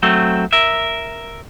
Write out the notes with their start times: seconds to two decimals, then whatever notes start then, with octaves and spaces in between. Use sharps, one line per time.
0.03 F#3 A3 C4
0.53 A#4 E5